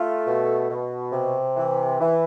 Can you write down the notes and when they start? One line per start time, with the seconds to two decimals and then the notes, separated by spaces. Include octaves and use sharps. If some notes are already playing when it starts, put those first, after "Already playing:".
Already playing: A3 F4
0.25 B2
0.69 B2
1.12 C3
1.56 E3
2.00 E3